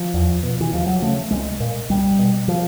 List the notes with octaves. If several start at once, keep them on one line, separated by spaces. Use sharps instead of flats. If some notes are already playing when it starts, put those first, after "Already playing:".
Already playing: F3
E2
B2
E3
D#2 F3
F#3
C#3 A3
C2 G#3
A#2
C2 G3
B2
F3